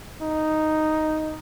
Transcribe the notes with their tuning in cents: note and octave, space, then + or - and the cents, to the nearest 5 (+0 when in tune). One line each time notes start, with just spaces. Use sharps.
D#4 +0